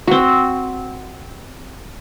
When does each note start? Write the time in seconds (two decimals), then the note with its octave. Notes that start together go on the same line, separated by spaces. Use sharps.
0.07 C4 F#4